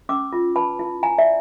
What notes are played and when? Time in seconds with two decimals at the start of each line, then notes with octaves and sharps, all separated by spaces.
0.09 C#4 D6 E6
0.33 F4
0.56 B4 A5 B5
0.79 E4
1.03 E4 G#5 A#5
1.18 D5 E5